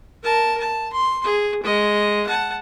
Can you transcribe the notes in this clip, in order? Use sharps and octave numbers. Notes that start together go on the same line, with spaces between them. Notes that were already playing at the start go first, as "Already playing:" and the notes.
A#4 A5
A5
C6
G#4
G#3 D#5
F#5 A5